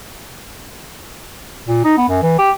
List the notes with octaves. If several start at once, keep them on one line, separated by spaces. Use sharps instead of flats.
A#2
D#4
B3
F#2
E3
G4